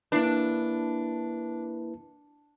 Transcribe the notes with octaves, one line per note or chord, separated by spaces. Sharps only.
A#3 D4 E4 B4